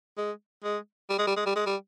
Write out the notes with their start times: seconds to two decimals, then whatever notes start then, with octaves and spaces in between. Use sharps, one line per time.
0.17 G#3
0.64 G#3
1.10 G3
1.18 G#3
1.27 G3
1.36 G#3
1.46 G3
1.56 G#3
1.66 G3